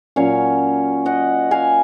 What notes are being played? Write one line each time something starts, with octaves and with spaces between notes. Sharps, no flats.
A#2 F#3 C#4 C#5 F5
D#5 F#5
F5 G#5